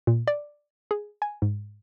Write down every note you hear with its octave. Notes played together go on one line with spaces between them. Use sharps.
A#2
D5
G#4
G#5
G#2